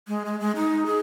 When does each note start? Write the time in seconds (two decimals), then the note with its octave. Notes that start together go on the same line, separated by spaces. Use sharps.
0.08 G#3
0.25 G#3
0.40 G#3
0.56 D#4
0.86 G#4